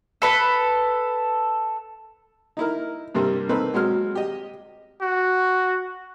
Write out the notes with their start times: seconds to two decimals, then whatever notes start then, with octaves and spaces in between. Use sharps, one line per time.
0.22 A4 B4 B5
2.57 D#4 E4 A#4
3.15 G2 C3 G3 A#3 C4
3.49 A#3 C4 D#4 A4 B4
3.74 F#3 G#3 C4 F6
4.15 G4 D#5
5.02 F#4